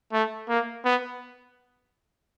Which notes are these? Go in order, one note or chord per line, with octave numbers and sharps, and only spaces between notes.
A3
A#3
B3